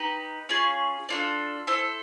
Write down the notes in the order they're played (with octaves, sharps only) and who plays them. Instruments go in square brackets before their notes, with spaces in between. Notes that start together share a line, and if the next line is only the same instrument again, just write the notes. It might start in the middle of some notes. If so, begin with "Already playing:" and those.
Already playing: [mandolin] D#4 G4 B4
C#4 F4 G#4
D4 F4 A4 D5
E4 A4 C5